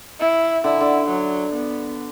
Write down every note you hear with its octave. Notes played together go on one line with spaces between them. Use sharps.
E4
D3 E4
D3
F#3
B3